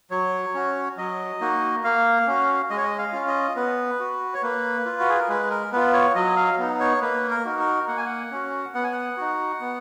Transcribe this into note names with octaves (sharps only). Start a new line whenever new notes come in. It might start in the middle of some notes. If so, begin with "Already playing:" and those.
F#3 C#5
C#4 F#4
F#3 D#5
A#3 D#4 F#4
A#3 F5
C#4 F#4
G#3 D#5
C#5
D#5
F5
C#4 F4
D#5
B3 B4
F#4
C#5
A#3 B4
F4
F#4
G#4
A#4
G#3 B4
A#4
B3 F4 B4
C#5
F#3 D#5
F5
B3 D#4
C#5
A#3 B4
A#4
D#4 F#4
A#4
A#3 F#5
G#5
F#5
C#4 F#4
B3 F#5
G#5
F#5
D#4 F#4
B3